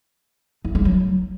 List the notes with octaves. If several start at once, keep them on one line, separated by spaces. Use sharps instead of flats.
D#4
G#3
F#3